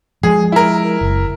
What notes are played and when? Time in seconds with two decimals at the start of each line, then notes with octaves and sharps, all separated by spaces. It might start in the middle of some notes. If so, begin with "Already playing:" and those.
0.23 F3 G#3 G#4
0.52 E4 A#4
1.01 F#1